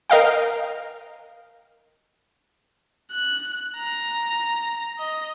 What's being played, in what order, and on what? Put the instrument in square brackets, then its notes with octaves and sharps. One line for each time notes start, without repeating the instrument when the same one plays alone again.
[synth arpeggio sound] A#4 D#5 F5 G5
[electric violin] F#6
A#5
D#5